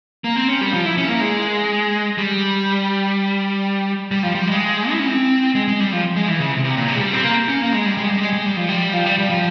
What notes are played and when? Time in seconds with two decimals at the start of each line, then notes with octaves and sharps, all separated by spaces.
0.24 A#3
0.36 C4
0.49 C#4
0.61 G3
0.73 F3
0.85 E4
0.97 C#4
1.08 A#3
1.21 G#3
2.18 G3
4.11 G3
4.23 F3
4.35 G3
4.48 G#3
4.91 E4
4.99 C#4
5.07 C4
5.55 G#3
5.68 G#3
5.80 G3
5.92 F3
6.16 G#3
6.28 E3
6.40 C#3
6.52 C3
6.64 C3
6.77 A#2
6.88 C3
6.96 G#3
7.00 G3
7.13 C4
7.24 A#3
7.48 C#4
7.61 A#3
7.73 G#3
7.86 G3
7.97 G#3
8.10 G3
8.21 G#3
8.33 G#3
8.45 G3
8.57 F3
8.69 G3
8.93 F3
9.06 G3
9.18 G3
9.30 F3